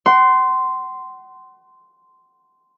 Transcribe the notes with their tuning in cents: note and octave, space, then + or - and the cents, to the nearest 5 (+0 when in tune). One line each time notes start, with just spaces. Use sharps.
F#5 +35 C6 -10